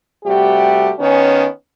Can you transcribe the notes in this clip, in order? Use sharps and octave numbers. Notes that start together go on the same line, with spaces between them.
C3 G3 A3 F#4 G4
D#3 B3 C#4